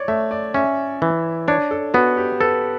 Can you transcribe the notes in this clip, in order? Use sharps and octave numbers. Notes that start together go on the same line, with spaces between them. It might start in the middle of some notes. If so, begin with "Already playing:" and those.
Already playing: C#5 D5
A3 E5
D5
C#4 E5
E3
D4 C#5
A4
B3 F#4
G4
A4 B4